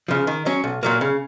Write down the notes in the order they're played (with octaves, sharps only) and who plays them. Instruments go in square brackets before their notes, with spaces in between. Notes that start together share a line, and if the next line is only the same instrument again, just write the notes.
[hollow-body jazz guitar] C#3 F3
D#3
F#3 C#4
B1
A#2 F#3 A#3
C#3